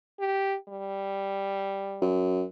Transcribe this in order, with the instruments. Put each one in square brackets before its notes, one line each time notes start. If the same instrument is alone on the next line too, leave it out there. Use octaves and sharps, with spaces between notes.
[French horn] G4
G3
[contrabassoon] F#2